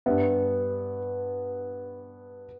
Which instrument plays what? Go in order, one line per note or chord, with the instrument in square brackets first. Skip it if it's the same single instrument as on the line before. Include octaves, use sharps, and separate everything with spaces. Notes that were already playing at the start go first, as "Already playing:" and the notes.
[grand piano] G2 G3 D4 B4 E5 [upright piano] B3